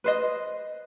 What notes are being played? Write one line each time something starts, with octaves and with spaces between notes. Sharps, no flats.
B4 C5 D#5